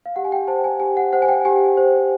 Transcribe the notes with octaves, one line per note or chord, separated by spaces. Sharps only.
F5
G4 F#5
G#5
G5
C5 A5
G#5
G4 G#5
F#5
C5 F#5
G#5
G5
G4 G#5
C5